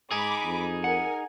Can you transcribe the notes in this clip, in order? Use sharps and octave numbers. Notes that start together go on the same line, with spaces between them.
G#2 D#4 G#4 B5 D6
F2
A#4 F#5 G#5